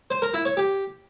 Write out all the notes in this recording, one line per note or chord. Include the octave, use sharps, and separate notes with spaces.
C5
A#4
E4
C#5
G4